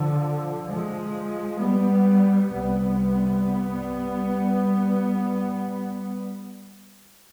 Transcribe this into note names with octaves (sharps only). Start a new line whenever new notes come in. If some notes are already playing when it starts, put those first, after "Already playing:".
Already playing: D3 F3
F3 G#3
G3 B3
C2 C3 G3 B3